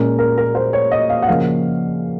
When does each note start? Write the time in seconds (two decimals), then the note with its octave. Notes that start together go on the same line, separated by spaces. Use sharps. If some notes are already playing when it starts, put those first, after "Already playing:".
Already playing: A#2 G#3 C#4 A#4
0.19 A#4
0.38 A#4
0.55 C5
0.73 C#5
0.91 D#5
1.10 F5
1.22 F#5
1.28 C#3 F3 A#3 C#4 F5